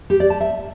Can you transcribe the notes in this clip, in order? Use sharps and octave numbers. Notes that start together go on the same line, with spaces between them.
G4
D5
A5
E5